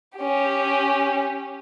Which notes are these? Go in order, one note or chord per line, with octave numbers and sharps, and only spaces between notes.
C#4 G4